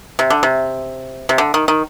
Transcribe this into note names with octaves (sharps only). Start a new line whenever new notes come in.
C3
D3
C3
C3
D3
D#3
D#3